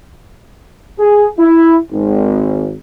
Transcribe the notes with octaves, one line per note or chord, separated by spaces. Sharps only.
G#4
E4
G#1